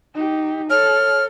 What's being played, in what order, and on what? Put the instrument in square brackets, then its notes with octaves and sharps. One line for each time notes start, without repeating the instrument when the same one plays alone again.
[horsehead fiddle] D#4 G4
[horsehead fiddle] A4 [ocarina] C#5 [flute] F6